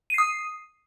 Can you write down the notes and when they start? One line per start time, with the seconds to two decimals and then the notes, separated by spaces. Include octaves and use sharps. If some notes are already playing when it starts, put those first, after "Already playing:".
0.10 D#7
0.14 C7
0.18 D#6